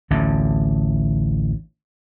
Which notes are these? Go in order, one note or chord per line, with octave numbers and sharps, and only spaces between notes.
A1 D2 D3